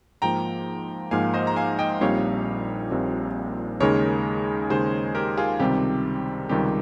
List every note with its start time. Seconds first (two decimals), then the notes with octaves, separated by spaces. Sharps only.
0.22 G#2 F3 A#3 G5 A#5
1.11 G#2 F3 A#3 F5 G#5
1.34 C5 D#5
1.47 A#5
1.56 F5 G#5
1.79 D#5 G5
2.01 A#1 A#2 G3 C4 D#4 C#5 F5
2.91 A#1 A#2 G3 C4 D#4
3.80 D#2 C#3 G#3 D#4 A#4 C#5
4.70 D#2 C#3 G#3 D#4 G#4 C5
5.15 G4 A#4
5.37 F4 G#4
5.60 C#2 C3 D#3 G3 C4 G4
6.49 C#2 C3 D#3 G3 C4 G4